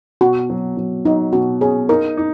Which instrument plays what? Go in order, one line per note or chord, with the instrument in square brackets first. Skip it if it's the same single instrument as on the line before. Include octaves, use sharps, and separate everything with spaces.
[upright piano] B2 [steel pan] F#4
[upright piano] F#3
F#3
[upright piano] F#3 [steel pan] D#4
[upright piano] B2 [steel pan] F#4
[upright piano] C#4 [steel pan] G#4
[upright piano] D#4 [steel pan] A#4
[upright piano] D#4